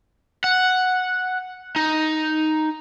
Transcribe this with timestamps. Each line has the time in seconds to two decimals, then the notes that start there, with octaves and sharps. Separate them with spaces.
0.44 F#5
1.76 D#4